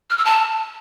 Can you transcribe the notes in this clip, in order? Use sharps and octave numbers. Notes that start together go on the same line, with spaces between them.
F6
E6
A5